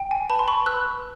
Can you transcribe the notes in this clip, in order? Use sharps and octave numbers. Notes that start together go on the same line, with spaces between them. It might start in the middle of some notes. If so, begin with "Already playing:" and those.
Already playing: G5
G#5
B4 A5 B5
C6
B5 C#6
B4 E6 F#6